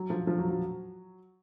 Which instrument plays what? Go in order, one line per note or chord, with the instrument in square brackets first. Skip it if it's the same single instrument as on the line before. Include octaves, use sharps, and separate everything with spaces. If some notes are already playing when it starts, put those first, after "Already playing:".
Already playing: [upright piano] F#3
F3
F3
F#3
F#3